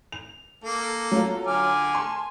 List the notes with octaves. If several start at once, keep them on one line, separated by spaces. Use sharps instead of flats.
F7
A#3 A4
F#3 F4
D3 G#5 D6 F6
A5 C6